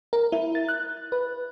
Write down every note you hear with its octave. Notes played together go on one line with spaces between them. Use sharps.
A#4
E4
A6
F#6
B4